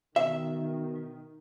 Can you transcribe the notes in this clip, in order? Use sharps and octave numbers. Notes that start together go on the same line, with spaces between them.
B2 D#3 E5